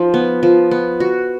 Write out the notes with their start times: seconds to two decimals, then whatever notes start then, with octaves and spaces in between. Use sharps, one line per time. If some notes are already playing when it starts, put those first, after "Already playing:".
Already playing: F3 D#4
0.14 B3
0.43 F3
0.71 B3
1.00 F#4